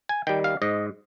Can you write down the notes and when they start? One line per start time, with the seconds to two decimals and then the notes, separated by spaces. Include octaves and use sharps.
0.09 G#5
0.27 D#3 G3 G5
0.44 F5
0.62 G#2 D#5